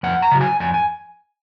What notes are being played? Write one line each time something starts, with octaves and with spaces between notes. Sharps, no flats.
F2 F#5
A#5
C#3 F#3
G#5
F2 G#5
G#5